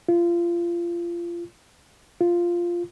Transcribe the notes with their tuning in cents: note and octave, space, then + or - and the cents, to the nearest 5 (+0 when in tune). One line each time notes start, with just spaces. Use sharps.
F4 -25
F4 -5